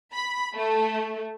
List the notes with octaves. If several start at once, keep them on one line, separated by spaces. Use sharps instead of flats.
B5
A3